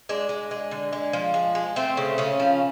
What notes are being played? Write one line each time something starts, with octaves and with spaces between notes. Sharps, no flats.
G#3 D4
G#3
G#3
D3
G#3
F3
G#3
G#3
A3 C4
C#3
C#3 C#4
F3